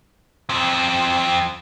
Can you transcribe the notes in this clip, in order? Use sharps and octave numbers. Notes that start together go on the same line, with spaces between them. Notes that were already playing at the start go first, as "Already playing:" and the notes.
F2 C4